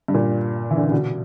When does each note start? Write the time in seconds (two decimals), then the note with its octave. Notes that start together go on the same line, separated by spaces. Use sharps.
0.08 G2
0.14 A#2
0.71 E3
0.77 D3
0.85 C#3
0.92 B2